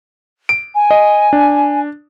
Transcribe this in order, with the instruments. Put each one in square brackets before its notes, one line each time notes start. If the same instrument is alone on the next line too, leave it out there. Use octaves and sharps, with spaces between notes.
[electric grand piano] D7
[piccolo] G#5
[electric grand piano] D#5
D4